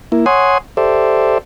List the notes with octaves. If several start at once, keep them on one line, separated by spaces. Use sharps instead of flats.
A#3 E4
C#5 F#5 G#5 C6 D#6
G4 A4 C5 D5 E5